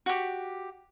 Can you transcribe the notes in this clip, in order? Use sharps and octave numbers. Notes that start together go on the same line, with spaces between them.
F#4 G4